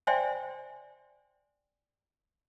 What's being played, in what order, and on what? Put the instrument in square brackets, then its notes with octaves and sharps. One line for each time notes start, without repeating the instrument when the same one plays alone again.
[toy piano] C5 D5 E5 G5 G#5 C6